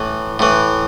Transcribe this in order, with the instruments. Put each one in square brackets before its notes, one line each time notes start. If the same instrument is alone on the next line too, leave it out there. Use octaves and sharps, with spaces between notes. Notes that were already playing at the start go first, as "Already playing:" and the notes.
Already playing: [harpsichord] A2 E3
A2 E3